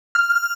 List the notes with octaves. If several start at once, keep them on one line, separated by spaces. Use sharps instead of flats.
F6